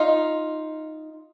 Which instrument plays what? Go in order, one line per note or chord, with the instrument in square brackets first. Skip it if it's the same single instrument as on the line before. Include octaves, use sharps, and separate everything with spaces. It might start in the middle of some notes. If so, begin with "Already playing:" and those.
Already playing: [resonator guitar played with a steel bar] D#4 F4